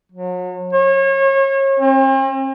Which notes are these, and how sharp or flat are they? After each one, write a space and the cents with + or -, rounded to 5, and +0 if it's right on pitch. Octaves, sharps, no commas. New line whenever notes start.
F#3 -35
C#5 -35
C4 +45